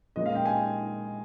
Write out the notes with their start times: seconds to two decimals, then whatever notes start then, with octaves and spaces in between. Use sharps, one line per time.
0.16 A#2 G#3 C#4 D#5
0.26 F5
0.35 G5
0.45 G#5